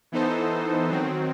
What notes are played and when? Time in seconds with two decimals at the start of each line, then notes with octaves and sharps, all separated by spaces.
0.12 E3 B3 D#4 A4 C5
0.90 D#3 F#3 C4